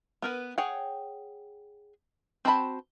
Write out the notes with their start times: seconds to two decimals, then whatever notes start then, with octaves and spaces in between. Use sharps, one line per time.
0.22 B3 A#4 B4
0.58 G#4 C#5 F#5 G5
2.45 C4 F#4 C5 A5 B5